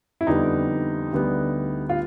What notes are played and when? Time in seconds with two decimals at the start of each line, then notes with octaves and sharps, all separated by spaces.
0.21 E4
0.27 F2 D3 G3 B3 D#4
1.13 D2 D3 G3 B3
1.89 F4